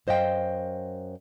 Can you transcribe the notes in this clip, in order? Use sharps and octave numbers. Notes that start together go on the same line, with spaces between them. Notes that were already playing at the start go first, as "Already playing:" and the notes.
F#2 C5 D#5 F5 G5